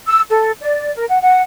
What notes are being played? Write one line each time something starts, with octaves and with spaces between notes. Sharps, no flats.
E6
A4
D5
A#4
F#5
F#5